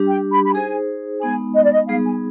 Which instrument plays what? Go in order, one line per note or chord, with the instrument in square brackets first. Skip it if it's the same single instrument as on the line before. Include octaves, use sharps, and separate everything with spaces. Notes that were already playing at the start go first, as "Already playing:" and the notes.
Already playing: [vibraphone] G3 D4 G4
[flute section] G5
B5
B5
[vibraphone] D#4 G#4 C5 [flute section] G#5
[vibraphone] G#3 B3 D#4 [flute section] G#5
[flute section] D#5
D5
D#5
[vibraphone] G3 B3 D#4 G#4 [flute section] F5
[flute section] G#5